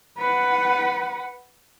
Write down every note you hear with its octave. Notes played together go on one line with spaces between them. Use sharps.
B4 F#5